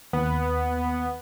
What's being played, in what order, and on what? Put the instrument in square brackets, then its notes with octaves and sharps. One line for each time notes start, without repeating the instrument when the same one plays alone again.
[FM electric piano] D#2 [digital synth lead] B3